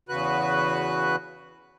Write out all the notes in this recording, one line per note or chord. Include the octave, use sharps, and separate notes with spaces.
E2 C#3 F#4 B4 F#6